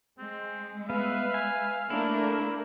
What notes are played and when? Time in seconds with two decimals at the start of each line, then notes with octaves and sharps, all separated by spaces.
0.18 G#3 C4
0.90 B3 B4 E5 F5
1.34 G#5
1.90 A3 A#3 D4 E4 A#4